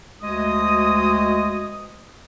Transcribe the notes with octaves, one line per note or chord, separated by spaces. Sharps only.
D2 G#3 F#4 D#5 D#6